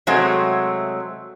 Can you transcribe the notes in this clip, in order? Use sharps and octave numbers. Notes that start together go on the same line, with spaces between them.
C3 F#3 G#3 A3 C4